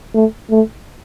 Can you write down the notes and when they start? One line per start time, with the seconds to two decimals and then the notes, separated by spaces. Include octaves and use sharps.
0.14 A3
0.50 A3